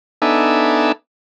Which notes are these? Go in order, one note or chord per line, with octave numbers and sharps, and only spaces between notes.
B3 D4 D#4 A4 E5 G#5